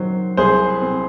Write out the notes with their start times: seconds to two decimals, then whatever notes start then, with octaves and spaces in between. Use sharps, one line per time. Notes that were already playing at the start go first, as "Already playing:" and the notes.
Already playing: D#3 F#3 C5
0.37 C2 G#4 C5
0.82 C4